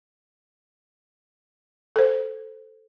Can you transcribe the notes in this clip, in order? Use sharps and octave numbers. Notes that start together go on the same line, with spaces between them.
A4 C5